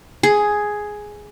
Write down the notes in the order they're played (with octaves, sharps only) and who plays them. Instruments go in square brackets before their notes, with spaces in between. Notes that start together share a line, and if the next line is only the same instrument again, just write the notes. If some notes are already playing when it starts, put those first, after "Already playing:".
[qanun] G#4